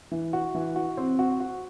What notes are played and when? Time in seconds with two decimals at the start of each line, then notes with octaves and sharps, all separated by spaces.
0.12 E3
0.33 F#4
0.55 E3
0.76 F#4
0.97 C4
1.19 F#4
1.40 F#4